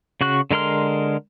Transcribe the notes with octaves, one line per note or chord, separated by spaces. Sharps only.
C#3 F#4 C#6 F#6
D3 G#3 A#4 C6 F6